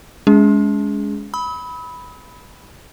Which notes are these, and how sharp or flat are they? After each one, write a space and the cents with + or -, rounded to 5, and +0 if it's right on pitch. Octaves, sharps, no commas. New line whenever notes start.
G#3 +0 C#4 +35 G#4 +0
B5 +0 E6 -45